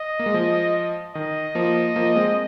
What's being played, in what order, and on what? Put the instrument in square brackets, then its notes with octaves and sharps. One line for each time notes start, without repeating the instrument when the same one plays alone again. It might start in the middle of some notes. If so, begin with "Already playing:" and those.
Already playing: [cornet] D#5
[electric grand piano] A#3
G#3
F3
[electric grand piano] D#3 [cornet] D#5
[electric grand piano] F3 A#3
F3 A#3
G#3 C4